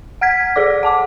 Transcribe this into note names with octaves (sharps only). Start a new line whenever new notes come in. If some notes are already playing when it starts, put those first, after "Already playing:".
F#5 F6 G#6 B6
G#4 A4 D5 D6
F#5 A5 D6